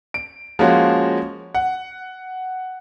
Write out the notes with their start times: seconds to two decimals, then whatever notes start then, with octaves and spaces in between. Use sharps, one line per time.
0.14 D7
0.59 F3 G#3 A#3 C#4 F#4
1.55 F#5